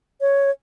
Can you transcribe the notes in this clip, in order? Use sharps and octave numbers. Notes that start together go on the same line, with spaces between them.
C#5